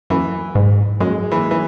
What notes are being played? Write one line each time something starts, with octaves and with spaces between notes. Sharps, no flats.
F#2 E3
G#2
F#2 G#3
E3
E3